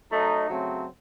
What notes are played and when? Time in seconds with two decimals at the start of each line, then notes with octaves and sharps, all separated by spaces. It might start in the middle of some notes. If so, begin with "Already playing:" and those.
0.11 F#3 A3 D#4
0.49 C#3 F#3 A3 C4